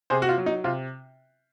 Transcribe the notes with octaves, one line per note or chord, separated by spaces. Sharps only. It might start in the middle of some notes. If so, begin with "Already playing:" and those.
C3 G#4 C5
F#4
F4
F#3
D#4
C3 F4